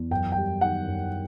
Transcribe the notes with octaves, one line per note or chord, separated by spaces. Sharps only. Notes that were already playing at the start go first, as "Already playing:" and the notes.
Already playing: E2
F#2 G5
G5
G3
D#3 F#5
F#2